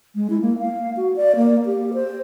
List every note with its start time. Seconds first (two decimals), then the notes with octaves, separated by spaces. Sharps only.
0.16 G#3
0.30 E4
0.41 A#3
0.59 F5
0.97 F#4
1.16 D5
1.36 A#3
1.66 G4
1.94 C5